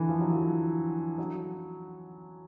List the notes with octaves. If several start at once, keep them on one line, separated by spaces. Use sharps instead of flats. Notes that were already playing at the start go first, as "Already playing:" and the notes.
Already playing: D3 E3
F3
F#3
F3
F#3